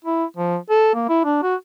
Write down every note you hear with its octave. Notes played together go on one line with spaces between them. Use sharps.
E4
F3
A4
A#3
E4
D4
F#4